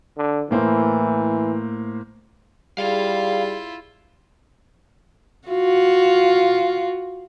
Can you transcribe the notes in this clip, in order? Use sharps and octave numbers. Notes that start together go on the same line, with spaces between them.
D3
A2 E3 A#3 C5
G3 E4 F4 G#4 F5
F4 F#4